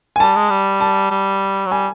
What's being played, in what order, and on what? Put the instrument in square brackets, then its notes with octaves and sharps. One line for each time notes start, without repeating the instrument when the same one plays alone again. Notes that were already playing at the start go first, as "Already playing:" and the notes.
[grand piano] G#5
[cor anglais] G3 [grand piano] A5
[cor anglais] G#3
G3
[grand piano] A5
[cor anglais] G3
F#3
[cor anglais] G3 [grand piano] G#5